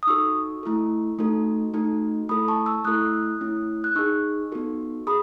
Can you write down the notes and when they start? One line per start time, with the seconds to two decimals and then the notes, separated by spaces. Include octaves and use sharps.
0.03 D#6
0.07 D#4 F#4 A4 C#6 E6
0.63 A3 E4 A4
1.19 A3 D#4 F#4 A4
1.74 A3 D#4 F#4 A4
2.29 A3 E4 A4 B5 D#6
2.48 A5 C#6
2.66 C#6 E6
2.84 A3 E4 A4 D#6 F#6
3.41 A3 C#4 E4
3.84 F#6
3.95 D#4 G#4 C#6 E6
4.52 B3 D#4 F#4 A4
5.07 G#4 B5 D#6